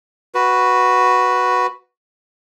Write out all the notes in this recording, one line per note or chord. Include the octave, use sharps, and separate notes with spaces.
F#4 B4